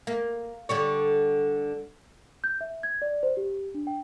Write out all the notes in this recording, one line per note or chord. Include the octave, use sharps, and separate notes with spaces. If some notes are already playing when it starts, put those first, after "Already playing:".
A#3
D3 G3 C#5
G6
E5
G#6
D5
C5
G4
D4
G5